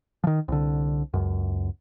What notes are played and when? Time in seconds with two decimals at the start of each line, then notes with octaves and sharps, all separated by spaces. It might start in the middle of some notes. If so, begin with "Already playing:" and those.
0.24 D#3 F3
0.48 C2 D3
1.14 C#2 F#2